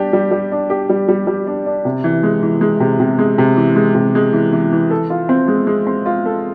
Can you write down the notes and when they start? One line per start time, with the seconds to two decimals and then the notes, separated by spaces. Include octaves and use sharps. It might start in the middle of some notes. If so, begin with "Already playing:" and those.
Already playing: G3 D4 G4
0.13 G3
0.31 G3
0.52 D4
0.70 G4
0.89 G3
1.08 G3
1.27 G3
1.47 D4
1.66 D4
1.85 C3
2.04 E3
2.23 G#3
2.43 E3
2.61 G#3
2.80 C3
3.00 C3
3.19 G#3
3.38 C3
3.57 E3
3.76 G#3
3.95 C3
4.15 G#3
4.33 E3
4.52 E3
4.72 E3
4.90 A4
5.10 F4
5.29 C4
5.48 G#3
5.67 G#3
5.87 C4
6.06 F4
6.25 A4